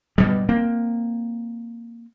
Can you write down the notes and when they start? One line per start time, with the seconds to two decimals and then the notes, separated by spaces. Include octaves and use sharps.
0.18 G2 B2 G3
0.49 A#3 C4